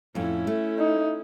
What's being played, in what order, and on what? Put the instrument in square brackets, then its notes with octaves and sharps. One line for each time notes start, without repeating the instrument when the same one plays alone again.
[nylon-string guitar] F2 A2 [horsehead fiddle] C#4 E4
[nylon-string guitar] A3
[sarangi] D#4